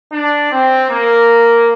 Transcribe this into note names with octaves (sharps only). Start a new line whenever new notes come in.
D4
C4
A#3